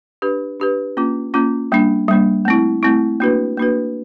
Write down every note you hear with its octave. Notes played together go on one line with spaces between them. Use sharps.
D4 G4 B4
D4 G4 B4
A#3 C#4 F4
A#3 C#4 F4
G3 A#3 D4
G3 A#3 D4
A3 C4 E4
A3 C4 E4
A#3 D4 F#4 B4
A#3 D4 F#4 B4